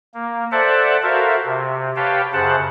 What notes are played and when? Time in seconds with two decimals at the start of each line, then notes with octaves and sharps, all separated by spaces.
0.14 A#3
0.52 A4 C5 D5 E5 F#5 A5
1.03 F#4 A4 A#4 C5 E5 F5
1.45 C3
1.96 G4 B4 C#5 F5 G5 A5
2.33 F#2 C#3 C5 F#5 A5